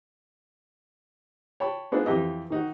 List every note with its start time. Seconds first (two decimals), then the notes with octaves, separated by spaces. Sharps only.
1.60 C#5 G5 A5 B5
1.92 G#3 B3 D4 D#4 F4 C5
2.06 F2 E3 G4 D#5
2.50 D#3 D#4 F#4